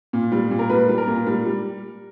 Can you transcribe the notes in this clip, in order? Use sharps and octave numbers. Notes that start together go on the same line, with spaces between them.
A#2
G3
A#2
A#4
G3 B4
G3
A#4
A#2
G3
G3